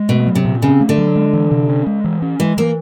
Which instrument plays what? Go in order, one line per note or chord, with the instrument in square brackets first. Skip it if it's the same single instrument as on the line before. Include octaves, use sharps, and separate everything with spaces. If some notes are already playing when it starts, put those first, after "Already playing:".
Already playing: [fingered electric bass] G#3
[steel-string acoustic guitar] B2 [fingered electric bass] A3
[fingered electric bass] F#3
[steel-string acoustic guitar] C3
[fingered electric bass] A#2
[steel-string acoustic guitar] C#3 [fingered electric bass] C4
[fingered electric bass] A3
[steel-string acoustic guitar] D3
[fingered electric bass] F#3
G#3
E3
C3
C#4
G#3
E3
C#4
[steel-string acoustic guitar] E3 [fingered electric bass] G#3
[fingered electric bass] E3 [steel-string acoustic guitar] A#3